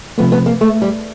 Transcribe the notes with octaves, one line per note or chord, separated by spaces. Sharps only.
C3 F3 A3 B3
B3
A#3
A3
G3